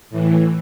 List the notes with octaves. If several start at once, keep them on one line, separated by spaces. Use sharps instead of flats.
A2 E3